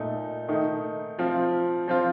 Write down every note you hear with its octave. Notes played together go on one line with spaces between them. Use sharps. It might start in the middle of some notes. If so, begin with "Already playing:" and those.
Already playing: A#2 A3 D#4
D#3 A3 D#4
F3 C4 F4
F3 C4 F4